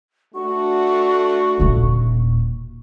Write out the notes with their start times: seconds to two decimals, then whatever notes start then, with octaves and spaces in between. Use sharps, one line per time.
0.35 A3 D4 F#4 C#6
1.60 D#1 A#2